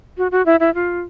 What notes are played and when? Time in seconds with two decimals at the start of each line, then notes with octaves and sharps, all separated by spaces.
0.18 F#4
0.31 F#4
0.46 E4
0.60 E4
0.74 F4